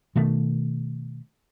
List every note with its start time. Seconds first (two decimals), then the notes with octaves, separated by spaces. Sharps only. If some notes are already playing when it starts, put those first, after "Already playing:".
0.16 B2 D#3 A3